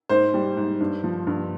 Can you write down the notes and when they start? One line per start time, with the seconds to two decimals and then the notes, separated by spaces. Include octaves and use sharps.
0.09 G#2 C5
0.34 G3
0.57 G#2
0.80 G2
1.04 F3
1.27 G2